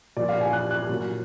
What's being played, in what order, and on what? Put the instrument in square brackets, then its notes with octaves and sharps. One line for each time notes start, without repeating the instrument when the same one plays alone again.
[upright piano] A#2 F3 D5
F5
G#5
F#6
F#6
A#2 F#3